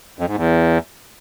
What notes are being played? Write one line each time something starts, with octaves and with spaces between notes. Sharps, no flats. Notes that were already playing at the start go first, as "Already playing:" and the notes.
F2
G#2
E2